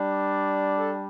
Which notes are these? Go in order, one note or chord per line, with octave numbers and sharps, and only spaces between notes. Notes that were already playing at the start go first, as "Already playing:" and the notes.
Already playing: G3 D4
A4